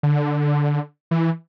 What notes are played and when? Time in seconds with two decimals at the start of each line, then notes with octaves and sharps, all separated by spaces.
0.03 D3
1.11 E3